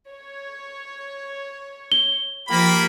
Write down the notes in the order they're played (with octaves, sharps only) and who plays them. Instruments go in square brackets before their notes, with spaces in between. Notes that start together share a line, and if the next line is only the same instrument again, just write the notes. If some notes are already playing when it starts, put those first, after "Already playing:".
[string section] C#5
[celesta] G7
[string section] F3 G4 [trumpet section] A#3 B5